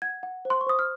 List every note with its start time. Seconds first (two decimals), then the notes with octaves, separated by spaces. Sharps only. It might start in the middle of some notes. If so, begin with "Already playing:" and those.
0.02 F#5 G#6
0.23 F#5
0.45 C5
0.50 C6
0.61 C#6
0.67 C5 D#6
0.79 F6